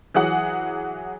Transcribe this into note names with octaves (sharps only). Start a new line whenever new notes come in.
E3 F#3 G#4 F#5